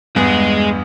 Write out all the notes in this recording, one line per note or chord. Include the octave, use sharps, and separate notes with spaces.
E2 G2 G#3 B3 G#4